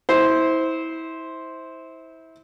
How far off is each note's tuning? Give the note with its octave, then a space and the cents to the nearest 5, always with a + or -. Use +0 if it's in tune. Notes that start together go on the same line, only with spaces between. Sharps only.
E4 -25 C5 +0